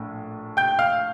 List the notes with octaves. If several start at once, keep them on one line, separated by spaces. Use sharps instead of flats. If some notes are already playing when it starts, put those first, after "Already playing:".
Already playing: A#1 A2
G5 G6
F5 F6